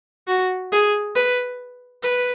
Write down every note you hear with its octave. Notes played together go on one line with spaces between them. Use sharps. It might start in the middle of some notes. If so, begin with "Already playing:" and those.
F#4
G#4
B4
B4